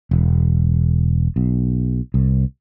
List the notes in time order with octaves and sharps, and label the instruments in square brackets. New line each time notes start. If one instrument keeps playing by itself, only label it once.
[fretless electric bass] E1
B1
C2